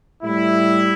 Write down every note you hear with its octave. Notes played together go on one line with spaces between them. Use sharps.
A2 G3 E4